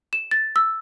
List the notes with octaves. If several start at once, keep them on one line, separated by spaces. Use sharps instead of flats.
E7
A6
E6